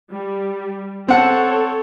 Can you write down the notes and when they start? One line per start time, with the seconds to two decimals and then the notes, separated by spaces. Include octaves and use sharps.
0.10 G3
1.08 C4 A4 C#5 F#5 F#6